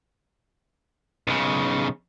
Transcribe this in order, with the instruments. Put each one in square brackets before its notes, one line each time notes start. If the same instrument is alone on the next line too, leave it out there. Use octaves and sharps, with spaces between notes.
[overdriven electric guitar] B1 C#3